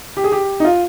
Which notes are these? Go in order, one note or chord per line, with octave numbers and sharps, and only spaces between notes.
G4
G#4
G4
D#4
F4